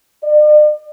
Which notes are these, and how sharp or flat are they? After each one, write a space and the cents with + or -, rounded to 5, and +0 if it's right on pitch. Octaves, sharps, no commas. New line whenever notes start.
D5 +45